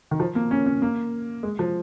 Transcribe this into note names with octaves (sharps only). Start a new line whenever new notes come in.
D#3
F3
A#3
C#4
C#4
A#3
G#3
F3